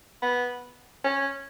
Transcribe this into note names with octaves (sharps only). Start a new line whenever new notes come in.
B3
C#4